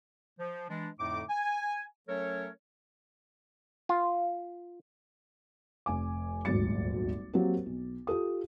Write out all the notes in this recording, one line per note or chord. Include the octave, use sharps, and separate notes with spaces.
F3
E3 G#3 D4
F2 A2 D3 A3 D#4 D6
G#5
F#3 A3 C#4 A4 A#4 C#5
F4
F1 G#5 D6
D#1 G#1 D2 F#3 A6 C#7
F#3 A#3 C4 F#4 G4 A#4
B1
F4 G4 A4 D#6